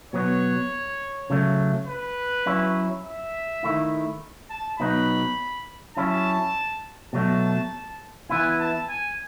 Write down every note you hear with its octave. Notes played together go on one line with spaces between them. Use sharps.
B2 F#3 B3 C#5
C#3 F#3 A3
B4
F#3 C#4 E4
E5
D#3 A3 E4
A5
B2 F#3 B3 D#4 B5
F#3 C#4 E4 A5
B2 F#3 A3 A5
E3 B3 E4 G#5
A5
G#5